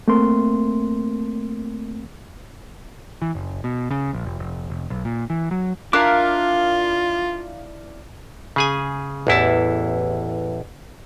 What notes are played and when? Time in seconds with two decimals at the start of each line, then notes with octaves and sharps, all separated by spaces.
0.08 A3 A#3 C4 A#4 C6
3.22 E3
3.35 F#1
3.64 B2
3.91 C#3
4.13 A#1
4.25 F1
4.39 F1
4.70 F1
4.90 B1
5.05 A#2
5.30 E3
5.51 F#3
5.93 D4 E4 F4 A#4 F5 D6
8.56 C#3 G#4 G#5
9.27 A1 E2 E4 A5